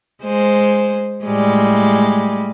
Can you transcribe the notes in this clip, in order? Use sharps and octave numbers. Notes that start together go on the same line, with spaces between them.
G#3 C5
A2 G3 G#3